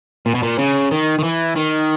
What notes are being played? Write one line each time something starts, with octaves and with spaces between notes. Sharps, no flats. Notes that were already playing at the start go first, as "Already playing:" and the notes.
A#2
B2
A#2
C#3
D#3
D#3
E3
D#3